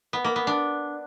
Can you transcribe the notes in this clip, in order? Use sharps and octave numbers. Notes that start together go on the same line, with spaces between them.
B3
A#3
B3
D4